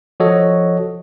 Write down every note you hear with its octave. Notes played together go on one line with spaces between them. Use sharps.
F3 F#4 A4 C#5 D#5